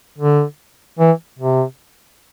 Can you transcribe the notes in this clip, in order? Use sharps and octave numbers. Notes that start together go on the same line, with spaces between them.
D3
E3
C3